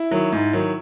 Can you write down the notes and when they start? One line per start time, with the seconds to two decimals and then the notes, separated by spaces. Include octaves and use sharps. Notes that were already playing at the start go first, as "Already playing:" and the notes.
Already playing: E4
0.11 D#3 F#3
0.32 G#2
0.53 D#3 F#3